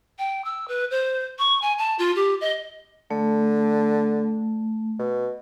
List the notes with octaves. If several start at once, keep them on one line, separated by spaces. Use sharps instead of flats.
G5
E6
B4
C5
C#6
G#5
A5
F4
G4
D#5
D3 A3
B2